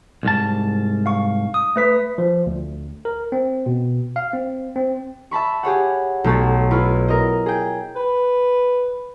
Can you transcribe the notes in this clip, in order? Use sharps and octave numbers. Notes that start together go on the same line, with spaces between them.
C2 G#2 A5
F5 C#6
D#6
A3 B4 B6
F3
D2
A#4
C4
B2
F5
C4
C4
E5 A5 B5 C#6
G4 G#4 C#5 F#5
B1 A3 C#5 A6
E4 F4 B4 C#5
A#4 D#5
G#4 G5
B4